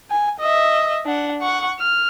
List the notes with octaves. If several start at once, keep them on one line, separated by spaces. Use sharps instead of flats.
G#5
D#5 E5
D4 F#5
F#5 C#6
F6